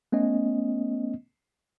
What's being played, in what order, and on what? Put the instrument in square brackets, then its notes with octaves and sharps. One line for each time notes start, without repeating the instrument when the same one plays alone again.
[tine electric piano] A3 B3 C#4 D#5